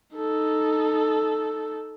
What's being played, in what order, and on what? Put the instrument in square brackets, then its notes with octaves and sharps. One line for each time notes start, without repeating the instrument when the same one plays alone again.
[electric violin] D#4 A4